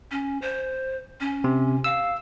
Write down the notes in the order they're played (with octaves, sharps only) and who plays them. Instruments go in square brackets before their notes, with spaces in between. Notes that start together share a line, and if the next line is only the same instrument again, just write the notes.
[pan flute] C#4
C5
C#4
[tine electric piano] C3
[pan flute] F5 [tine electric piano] E6